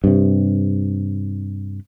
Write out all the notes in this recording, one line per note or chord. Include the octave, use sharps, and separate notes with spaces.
G2 C3